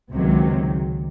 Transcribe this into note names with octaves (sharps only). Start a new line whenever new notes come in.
C#2 C3 D#3 F#3